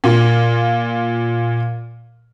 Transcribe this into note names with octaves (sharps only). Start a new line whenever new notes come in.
A#2 F4